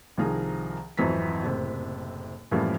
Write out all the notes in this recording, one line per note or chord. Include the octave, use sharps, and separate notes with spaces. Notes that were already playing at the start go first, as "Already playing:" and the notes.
C2 D#3 F3 G#4 A#5
G#1 F2 E3 F#3 A#5 B6
F#1 A2 C3
F#2 A2 E3 F3 G3 A#3